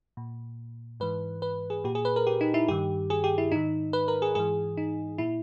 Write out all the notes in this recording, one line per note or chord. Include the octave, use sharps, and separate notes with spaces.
A#2
G#2 E3 B4
B4
G#4
A#2 G4
G#4
B4
A#4
G4
D#4
E4
G2 D#3 G4
G#4
G4
E4
G#2 D#3 D#4
B4
A#4
G#4
G#2 E3 G#4
D#4
A#2 E4